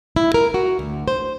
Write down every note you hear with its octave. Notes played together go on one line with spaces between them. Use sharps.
E4
A#4
F#4
D2
C5